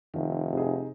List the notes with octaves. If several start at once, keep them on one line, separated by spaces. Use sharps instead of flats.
F1 D#3
C3 D#4 G#4